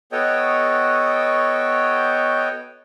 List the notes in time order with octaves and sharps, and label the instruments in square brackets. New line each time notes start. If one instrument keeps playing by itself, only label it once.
[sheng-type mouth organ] B3 F#4 A4 C#5 D#5 G5